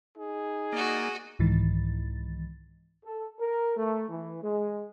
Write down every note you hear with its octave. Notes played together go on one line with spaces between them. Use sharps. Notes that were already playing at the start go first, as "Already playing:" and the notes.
D#4 G#4
A#3 F#4 D5 D#5
C2 G#2 D#3 E3 A6
A4
A#4
A3
E3
G#3